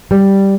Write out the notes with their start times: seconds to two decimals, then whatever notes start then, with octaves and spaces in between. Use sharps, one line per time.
0.11 G3